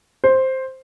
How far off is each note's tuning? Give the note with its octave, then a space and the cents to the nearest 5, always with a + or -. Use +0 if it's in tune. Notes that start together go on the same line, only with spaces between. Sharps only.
C5 +5